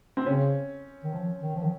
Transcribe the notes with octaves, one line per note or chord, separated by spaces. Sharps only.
C4
C#3 C#4
D#3
F3
D#3
F3
D#3